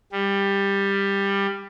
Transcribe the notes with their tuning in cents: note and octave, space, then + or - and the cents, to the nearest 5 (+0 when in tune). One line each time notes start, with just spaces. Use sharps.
G3 +15